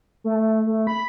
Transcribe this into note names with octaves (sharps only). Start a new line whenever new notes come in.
A3
A3
A3
B5